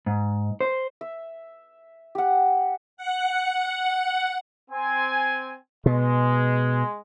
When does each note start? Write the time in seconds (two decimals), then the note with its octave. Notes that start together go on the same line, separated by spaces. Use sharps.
0.06 G#2
0.61 C5
1.01 E5
2.15 G4 F#5
2.97 F#5
4.71 C4 G#5
5.86 B2 G#3